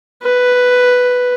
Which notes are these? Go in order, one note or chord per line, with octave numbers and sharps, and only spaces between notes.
B4